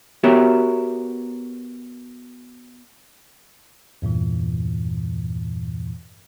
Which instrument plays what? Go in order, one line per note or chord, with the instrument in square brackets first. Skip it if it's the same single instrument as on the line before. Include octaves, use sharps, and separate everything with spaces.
[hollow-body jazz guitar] B3 F#4 G4 A#4 C#5 E5
[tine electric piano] E2 G2 A#2 E3